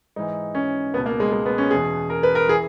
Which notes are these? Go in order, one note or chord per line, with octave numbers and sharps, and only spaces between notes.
G#2 E3 D#4
C#4
C#2 B2 B3
A#3
G#3
G#3
B3
C#4
E2 B2 G#4
A#4
B4
A#4
E3 G#4